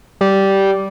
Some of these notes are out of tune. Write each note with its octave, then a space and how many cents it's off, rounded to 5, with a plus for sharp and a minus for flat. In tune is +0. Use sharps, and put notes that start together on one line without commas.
G3 -10